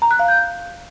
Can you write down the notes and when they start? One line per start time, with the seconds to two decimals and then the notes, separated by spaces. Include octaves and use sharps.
0.02 A#5
0.11 F#6
0.19 F5
0.28 G6